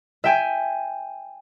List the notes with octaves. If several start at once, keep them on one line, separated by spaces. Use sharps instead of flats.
E5 G5 G#5